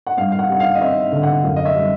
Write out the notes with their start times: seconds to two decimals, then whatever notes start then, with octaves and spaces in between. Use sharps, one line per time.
0.07 F#5
0.17 G2 F5
0.32 F5
0.39 F#5
0.50 G3 F#5
0.60 F5
0.75 D#5
0.81 C4 E5
1.12 D3
1.23 F#5
1.44 F#2 F5
1.56 D#5
1.65 E5
1.76 G3